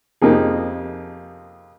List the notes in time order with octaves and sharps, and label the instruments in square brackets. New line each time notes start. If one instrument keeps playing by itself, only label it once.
[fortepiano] F2 C3 F3 A#3 D#4 G#4